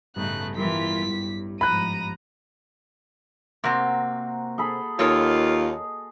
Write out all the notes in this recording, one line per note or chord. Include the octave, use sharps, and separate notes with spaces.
A1 G2 C#3 A3 B3 D#4 F#6
E3 G3 E4 F4 A#4 B6
G2
G#2 F3 A#5 B5 F#6 D#7
C3 A#3 C4 F#4 A#5
G#4 A4 B5
D#2 F4 A4 A#4 C#5 D#5